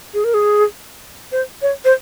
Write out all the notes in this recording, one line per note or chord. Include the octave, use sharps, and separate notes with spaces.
G#4
A#4
G#4
C5
C#5
C5